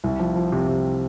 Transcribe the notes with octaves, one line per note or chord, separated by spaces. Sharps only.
C2
F3
F3
C3
C3